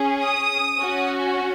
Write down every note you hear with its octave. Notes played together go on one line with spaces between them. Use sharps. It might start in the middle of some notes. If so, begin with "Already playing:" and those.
Already playing: C#4 G#4
D#6
C#4 F#4